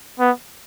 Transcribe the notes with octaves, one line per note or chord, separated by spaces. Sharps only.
B3